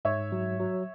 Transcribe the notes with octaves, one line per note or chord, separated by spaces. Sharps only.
G#2 C#5 E5
F#3
F#3